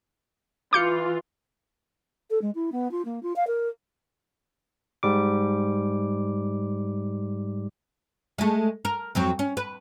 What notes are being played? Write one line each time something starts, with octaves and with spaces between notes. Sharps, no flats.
E3 F4 D6 G6 C#7
A4
G#3
E4
B3
F4
A#3
F4
F5
A#4
G#2 G3 D6
G#3 A3
A#4
F2 F#3 C4
C#4
B4